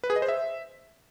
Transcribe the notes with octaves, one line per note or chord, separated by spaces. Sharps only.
B4
G#4
D#5
C5
E5